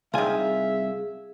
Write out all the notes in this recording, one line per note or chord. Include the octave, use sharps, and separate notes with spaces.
C2 D#3 F4 G#4 E5 G#5